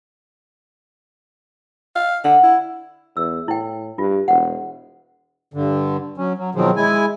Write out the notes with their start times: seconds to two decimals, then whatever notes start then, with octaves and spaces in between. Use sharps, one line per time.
1.96 F5
2.24 D3 F#5
2.43 E4
3.17 E2 E6
3.48 A2 E4 G5
3.98 G2 F4
4.28 E1 F#5
5.54 G2 D3
6.18 F#3 C#4
6.38 F#3
6.55 B2 D#3 F3 F#3 G#3 C4
6.76 G#3 E4 G#5